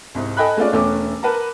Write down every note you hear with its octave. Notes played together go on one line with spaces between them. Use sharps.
C2 G#2
A4 D#5 G5 G#5 B5 F#6
G#3 A3 C#4 F4 D5
E1 A3 C#4 D6
A#4 B4 F#5 A5 A#5